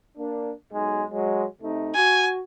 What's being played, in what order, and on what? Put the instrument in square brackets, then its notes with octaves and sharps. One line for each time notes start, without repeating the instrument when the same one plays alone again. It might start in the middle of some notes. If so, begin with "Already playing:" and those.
[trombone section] A#3 D4
B1 G#3 D#4
F#3 G#3
C3 A3 D#4
[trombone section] F#4 [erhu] G#5